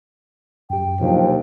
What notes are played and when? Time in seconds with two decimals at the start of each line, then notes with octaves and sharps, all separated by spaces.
0.70 F#2 G4 G5
1.01 D#2 B2 F3 F#3 D4